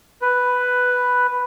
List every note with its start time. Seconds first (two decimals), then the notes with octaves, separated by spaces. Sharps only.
0.22 B4